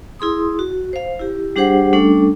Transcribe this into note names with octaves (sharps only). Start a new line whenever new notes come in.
E4 G#4 C6 D#6
F#4
C5 F5
E4 G4
G3 D4 G4 G#4 C5 F#5
G3 A3 C#4 D4 A4